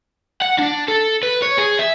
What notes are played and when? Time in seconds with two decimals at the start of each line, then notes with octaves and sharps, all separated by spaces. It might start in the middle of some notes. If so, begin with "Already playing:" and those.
0.41 F#5
0.59 D4
0.88 A4
1.23 B4
1.42 C#5
1.58 G#4
1.79 E5